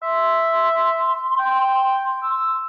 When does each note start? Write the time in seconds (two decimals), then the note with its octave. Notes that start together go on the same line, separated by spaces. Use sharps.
0.03 E5 C6
1.39 G5
2.23 E6